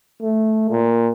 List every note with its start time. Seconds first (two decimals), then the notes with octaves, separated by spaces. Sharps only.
0.23 A3
0.71 A#2